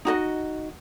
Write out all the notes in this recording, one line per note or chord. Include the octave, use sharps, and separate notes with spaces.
D#4 F#4 D#5